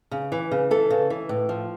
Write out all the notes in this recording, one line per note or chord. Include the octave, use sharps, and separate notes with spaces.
C#3
E3
C#3
E3 A4
C#3
E3
A2
F3